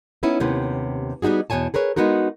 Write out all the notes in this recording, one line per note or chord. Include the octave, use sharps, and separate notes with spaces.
B3 C#4 D#4 E4
D#2 C3 B3 C#4
G3 B3 D#4 F#4 G#4
E2 B2 C#5 G#5 A5
G#4 A#4 B4 C#5
G#3 A#3 B3 D#4 F#4 A#4